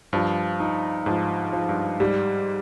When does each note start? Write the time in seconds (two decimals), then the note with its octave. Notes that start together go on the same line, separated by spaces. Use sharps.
0.13 G2 F3
0.60 D#4
1.06 G#2 F3
1.53 F3
1.69 G2
2.00 G#2 G3